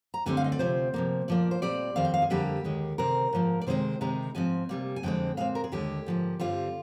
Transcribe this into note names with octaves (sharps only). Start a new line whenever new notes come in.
A#5
D2 D3 G3 C4 G#5
F5
D#5
D5
D2 C3 F3 C4 C5
C3 F3 A#3
A#2 F3 A#3 D5
C5
A#2 G3 C4 D5
F2 D#3 G3 C4 F5
G5
F5
G#4
F2 D3 G3 A#3 G4
D#2 D#3 G#3
C3 D#3 G3 C4 A#4
G#2 F3 A#3
D5
C3 D#3 G#3 C4 C5
C3 D#3 G#3 C4 A#5
G#2 F3 C4 G#5
C3 G3 A#3
G#5
F2 D3 G#3 C4 G5
A#2 G#3 C4 F5
A#4
G#4
D#2 D3 G#3 G4
G#2 F3 A#3
G2 D3 G3 C4 F4